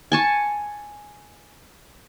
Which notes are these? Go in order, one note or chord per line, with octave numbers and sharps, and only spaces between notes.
G#5 A5 C#6